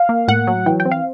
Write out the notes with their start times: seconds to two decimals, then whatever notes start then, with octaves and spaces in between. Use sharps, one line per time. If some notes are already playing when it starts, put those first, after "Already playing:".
Already playing: F5
0.09 A#3
0.28 A2 F#5
0.47 F#3
0.66 E3 G5
0.80 G5
0.85 C4
0.91 F5